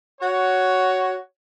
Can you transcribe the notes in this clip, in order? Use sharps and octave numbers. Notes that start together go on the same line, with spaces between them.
F#4 C#5